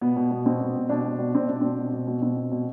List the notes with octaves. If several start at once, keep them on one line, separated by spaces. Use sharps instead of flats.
B2 B3
B2
B2
B2 C4
B2
B2
B2 D4
B2
B2
B2 C4
B2 D4
B2 C4
B2
B2
B2
B2 C4
B2
B2